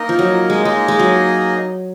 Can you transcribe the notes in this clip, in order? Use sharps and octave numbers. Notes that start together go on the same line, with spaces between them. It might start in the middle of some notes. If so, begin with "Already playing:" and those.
Already playing: A#3 D#4 A#4 D#5
F3
F#3
G#3
G#3 A#3 D#4 G#4 D#5
G#3
F#3